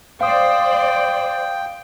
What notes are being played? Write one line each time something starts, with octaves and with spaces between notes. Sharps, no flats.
C5 D5 F5 G5 D#6